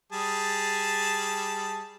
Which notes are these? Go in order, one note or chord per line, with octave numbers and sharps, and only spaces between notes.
G3 G#4 A5